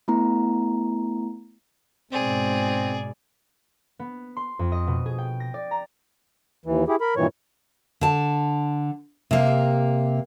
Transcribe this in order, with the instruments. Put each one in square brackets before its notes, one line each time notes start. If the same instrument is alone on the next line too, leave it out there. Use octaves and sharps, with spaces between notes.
[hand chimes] A3 B3 E4 A#5
[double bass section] G#2 B2 [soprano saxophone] C4 [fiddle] G#4 D5
[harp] B3
C6
F2
D#5
B2
G#4
G5
A#6
D5
A#5
[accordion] D#2 E3
E4 G4 G#4
A#4 B5
G2 A#2 D#3 E3 C#5
[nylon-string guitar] D3 A5
C3 A#3